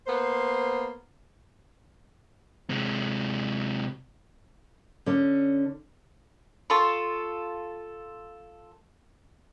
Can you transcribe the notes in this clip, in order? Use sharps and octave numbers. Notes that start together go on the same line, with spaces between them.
A#3 B3 C5
C3 G#3
D3 C#4
F4 A4 C6 C#6